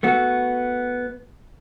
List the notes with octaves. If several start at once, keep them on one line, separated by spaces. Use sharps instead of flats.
A3 B3 F#4